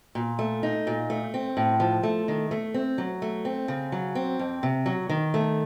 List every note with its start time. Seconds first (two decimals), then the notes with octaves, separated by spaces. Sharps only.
0.15 A#2
0.39 A3
0.63 D#4
0.87 A#2
1.10 A3
1.34 C4
1.57 A2
1.80 F3
2.03 A3
2.28 D#3
2.51 A3
2.74 C4
2.98 F#3
3.22 A3
3.45 C4
3.68 C#3
3.92 F#3
4.15 C4
4.39 F2
4.63 C3
4.86 F#3
5.09 D#3
5.34 A3